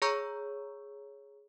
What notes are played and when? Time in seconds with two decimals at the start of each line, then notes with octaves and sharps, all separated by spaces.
0.02 G#4 C#5 A#5 C#6 E6 G6